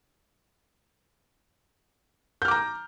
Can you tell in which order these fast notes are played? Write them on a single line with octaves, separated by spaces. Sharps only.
G6 F6 D6 A#5